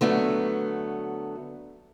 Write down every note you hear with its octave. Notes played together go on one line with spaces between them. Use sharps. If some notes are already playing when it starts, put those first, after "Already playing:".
D3 F#3 A3 B3